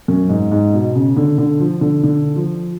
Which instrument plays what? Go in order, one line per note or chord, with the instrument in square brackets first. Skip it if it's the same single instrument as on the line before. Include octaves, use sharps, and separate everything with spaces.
[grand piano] F#2
G#2
G#2
B2
C#3
D3
D3
F3
D3
D3
F3